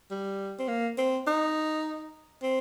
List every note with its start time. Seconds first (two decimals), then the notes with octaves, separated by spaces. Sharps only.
0.11 G3
0.59 C4
0.68 A#3
0.98 C4
1.27 D#4
2.43 C4